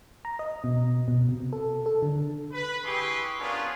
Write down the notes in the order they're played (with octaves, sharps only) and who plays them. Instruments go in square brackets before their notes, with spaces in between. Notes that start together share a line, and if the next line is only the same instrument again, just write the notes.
[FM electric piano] A#5
D#5
B2
B2
C3
A4
A4
D3
[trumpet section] B4
E4 G4 G#4 B4 C6 C#6
B3 C#4 D4 F4 G#4 A#4